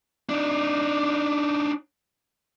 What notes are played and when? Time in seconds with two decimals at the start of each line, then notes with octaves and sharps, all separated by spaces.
0.29 D4 D#4